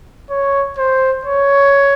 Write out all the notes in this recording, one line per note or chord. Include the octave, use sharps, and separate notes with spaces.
C#5
C5
C#5